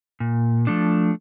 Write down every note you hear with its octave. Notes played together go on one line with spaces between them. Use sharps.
A#2
F3 A3 D4